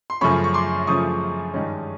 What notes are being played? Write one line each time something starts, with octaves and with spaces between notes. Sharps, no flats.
C6
F#2 C#3 F3 A3 C#4 B5 C#6
C#6
C6 D6
F#2 C#3 F3 A3 C#4 C#6 D#6
G2 D#3 G#3 C#4